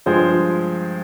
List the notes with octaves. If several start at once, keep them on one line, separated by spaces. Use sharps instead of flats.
G2 F3 G#3 G#4 C5